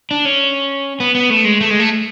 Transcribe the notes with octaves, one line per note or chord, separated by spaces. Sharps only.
D4
C#4
B3
B3
A3
G#3
A3
G#3
A3